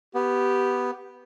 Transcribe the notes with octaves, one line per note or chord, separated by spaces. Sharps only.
B3 G4